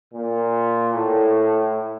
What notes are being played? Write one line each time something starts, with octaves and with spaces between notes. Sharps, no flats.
A#2
A2